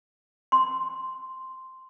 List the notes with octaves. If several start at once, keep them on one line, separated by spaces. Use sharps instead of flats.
C6